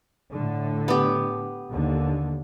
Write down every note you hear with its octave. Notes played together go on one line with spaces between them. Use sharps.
A2 D3
B3 G4
D#2 D3